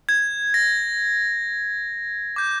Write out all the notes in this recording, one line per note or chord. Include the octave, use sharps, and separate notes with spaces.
G#6
A#6
D6 G6